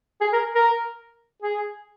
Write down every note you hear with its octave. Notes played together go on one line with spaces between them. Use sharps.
G#4
A#4
A#4
G#4